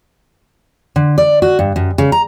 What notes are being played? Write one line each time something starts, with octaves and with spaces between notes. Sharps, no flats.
D3
D5
F#4
G2
F#2
C#3
A#5